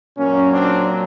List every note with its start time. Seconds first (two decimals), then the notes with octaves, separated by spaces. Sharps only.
0.17 A#2 F#3 A#3 C#4
0.52 C4 D4